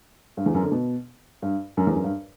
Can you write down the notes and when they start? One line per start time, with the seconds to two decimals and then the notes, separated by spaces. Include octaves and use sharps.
0.37 G2
0.46 E2
0.54 F#2
0.63 D3
0.72 B2
1.42 G2
1.77 F#2
1.87 E2
1.96 F#2
2.04 G2